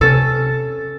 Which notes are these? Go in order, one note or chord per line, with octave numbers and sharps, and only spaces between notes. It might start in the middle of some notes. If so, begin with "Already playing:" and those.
C3 C#4 A4